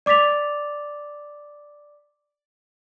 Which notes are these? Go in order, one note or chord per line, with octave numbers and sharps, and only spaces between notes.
D5 D6 A6 B6 F7